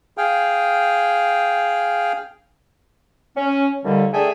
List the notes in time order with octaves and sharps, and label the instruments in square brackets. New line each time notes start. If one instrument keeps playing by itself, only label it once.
[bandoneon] G#4 F5 G5
[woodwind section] C#4
D#2 D3 G3
A3 D4 G#4 E5 G5 G#5